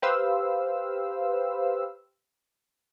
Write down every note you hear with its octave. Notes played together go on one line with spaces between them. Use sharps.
G4 B4 C5 F5 E6